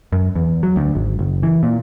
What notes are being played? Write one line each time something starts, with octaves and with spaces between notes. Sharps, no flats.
F#2
E2
F#3
D2
G#1
F#1
E3
A#2